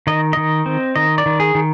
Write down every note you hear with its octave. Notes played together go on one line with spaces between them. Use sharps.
D#3 D#5
D#3 D#5
C4
D#3 D#5
D5
D#3
G#4
D#3